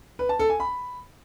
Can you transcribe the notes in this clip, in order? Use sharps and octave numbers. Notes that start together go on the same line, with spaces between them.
B4
A5
A4
G#5
B5